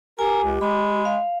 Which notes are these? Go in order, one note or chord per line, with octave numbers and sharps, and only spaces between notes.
G4 A#4 G#5
C#2
G#3 B5
F5